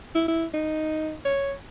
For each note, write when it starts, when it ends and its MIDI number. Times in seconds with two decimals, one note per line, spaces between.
0.15 0.26 64
0.28 0.45 64
0.54 1.14 63
1.25 1.52 73